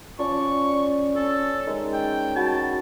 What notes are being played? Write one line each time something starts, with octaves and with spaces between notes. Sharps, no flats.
F3 C#4 D5 C#6
C#4 A4
D#3 G#3
G5
F#4 A5 B5